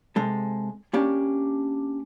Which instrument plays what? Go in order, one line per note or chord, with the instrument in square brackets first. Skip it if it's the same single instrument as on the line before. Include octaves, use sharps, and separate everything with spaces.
[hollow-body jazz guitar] C3 G#3 A4
A#3 C#4 D4 G4